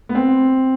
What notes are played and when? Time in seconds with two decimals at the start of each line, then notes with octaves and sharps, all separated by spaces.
0.09 B3
0.15 C4